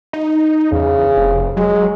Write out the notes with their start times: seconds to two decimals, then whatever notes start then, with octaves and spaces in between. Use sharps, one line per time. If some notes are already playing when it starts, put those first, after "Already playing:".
0.13 D#4
0.72 E2 C#3
1.17 F1
1.57 F#3 G#3